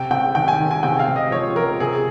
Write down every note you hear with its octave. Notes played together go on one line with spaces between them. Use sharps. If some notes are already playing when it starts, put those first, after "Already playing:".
Already playing: C3 G5
C3 G5
D#3 G5
G#5
D#3
G#5
C3 G5
F5
C3
D#5
F3 C#5
F3 A#4
C3 G#4